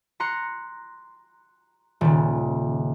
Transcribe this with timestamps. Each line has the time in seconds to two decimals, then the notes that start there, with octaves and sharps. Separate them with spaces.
0.20 A#5 C6 F#6 C#7
2.01 D#1 C#3